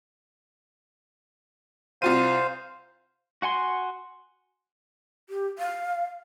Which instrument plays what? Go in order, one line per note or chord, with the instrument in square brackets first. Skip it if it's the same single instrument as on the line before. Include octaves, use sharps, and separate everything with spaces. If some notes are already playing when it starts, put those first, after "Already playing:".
[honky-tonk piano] C2 F4 D#7 [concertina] C5 F5
[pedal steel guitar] F#4 F#5 G#5 C6
[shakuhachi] G4
F5